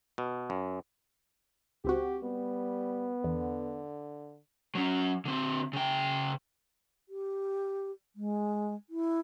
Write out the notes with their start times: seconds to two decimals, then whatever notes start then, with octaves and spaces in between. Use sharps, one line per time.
0.18 B2
0.50 F#2
1.85 C#2 C4 F#4 G4
2.23 G3 B3
3.24 E2 D3
4.75 F#3 C#4
5.25 D3 C4
5.73 C#3 G5
7.09 G4
8.16 G#3
8.90 E4